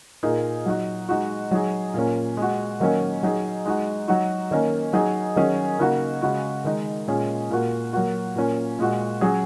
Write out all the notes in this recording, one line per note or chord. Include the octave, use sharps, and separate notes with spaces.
A#2 A#3 D#4 G#4
F#3 D#4 F#4
G#3 D#4 F#4
F#3 D#4 G#4
A#2 A#3 C#4
G#3 F#4
D#3 F#3 A#3 C#4
F#3 D#4 G#4
G#3 D#4 F#4
F#3 D#4 F#4
D#3 A#3 C#4
F#3 D#4 G#4
D#3 F#3 C#4 G#4
C#3 A#3 D#4 F#4
C#3 G#3 F#4
D#3 G#3 D#4
A#2 G#3 C#4 G#4
A#2 A#3 F#4
F#3 A#3 F#4
A#2 A#3 C#4
A#2 G#3 F#4
F#3 C#4 G#4